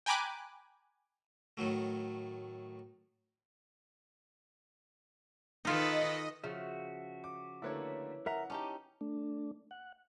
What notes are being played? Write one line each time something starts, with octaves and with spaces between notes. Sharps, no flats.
G5 G#5 A#5 B5 D6 F#6
A2 D#3 F#3 A3
D#3 D#4 F4 A4 B4 D#5
C#3 F3 F#4 E5
D6
D3 A3 A#3 E4 B4 C#5
A#4 E5 F#5 A#5
C#4 D#4 G4 A5 D6
A3 D4
F#5